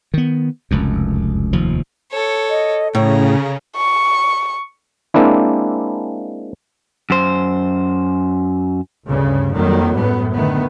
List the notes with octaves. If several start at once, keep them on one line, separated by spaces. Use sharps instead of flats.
D#3 B3
F1 C#2 F#2
F1 D#2 F3
A4 C#5
D#5
A2 C#3 C#5 A#5
C#6
G#3 A#3 C4 D4 E4
F#2 C5
D2 G2 C#3
F2 D#3 F#3 G3 A#3
F#2 A2 B3
D3 D#3 A3 B3